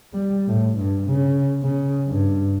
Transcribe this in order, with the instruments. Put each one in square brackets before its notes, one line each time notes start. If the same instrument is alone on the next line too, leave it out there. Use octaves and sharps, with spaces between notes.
[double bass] G3
A2
G2
C#3
C#3
G2